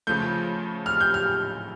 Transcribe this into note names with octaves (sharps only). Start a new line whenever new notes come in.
C#3 F3 A3 G6
F6
G6
F6